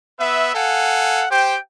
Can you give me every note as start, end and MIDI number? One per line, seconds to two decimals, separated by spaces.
0.20 0.53 59
0.20 0.53 71
0.20 0.53 76
0.55 1.26 69
0.55 1.26 77
0.55 1.26 78
0.55 1.26 80
1.31 1.57 67
1.31 1.57 72
1.31 1.57 79